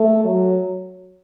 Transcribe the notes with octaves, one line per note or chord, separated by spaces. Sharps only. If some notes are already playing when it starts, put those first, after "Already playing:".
Already playing: A3
F#3